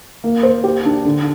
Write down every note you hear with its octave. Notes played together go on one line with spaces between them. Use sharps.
A#3
C5
G4
D4
D3